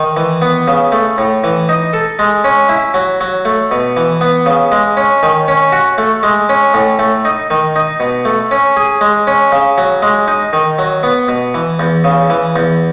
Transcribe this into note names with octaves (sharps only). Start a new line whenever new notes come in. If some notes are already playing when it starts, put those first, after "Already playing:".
Already playing: D#3
E3
B3
C#3
A3
A2
E3
D#4
A4
G#3
C#4
E4
F#3
F#3
A3
B2
E3
B3
C#3
G#3
C#4
D#3
C#4
F#4
A3
G#3
C#4
A2
A3
D#4
D#3
D#4
B2
A3
C#4
G#4
G#3
C#4
C#3
F#3
G#3
D#4
D#3
F#3
B3
B2
E3
E2
C#3
E3
E2